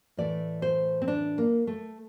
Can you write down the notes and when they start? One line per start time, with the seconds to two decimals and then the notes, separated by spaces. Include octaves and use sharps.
0.17 A2 E3 A3 D5
0.62 C5
1.02 C4
1.08 D4
1.38 A#3
1.67 A3